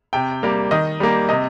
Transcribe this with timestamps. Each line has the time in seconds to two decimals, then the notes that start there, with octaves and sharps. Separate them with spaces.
0.13 C3 G5
0.43 G3 A#3
0.71 D#3 D#5
1.00 G3 A#3
1.29 C3 D#5